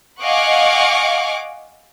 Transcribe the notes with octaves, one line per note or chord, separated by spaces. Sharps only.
D#5 F5 F#5 G#5 C#6 D6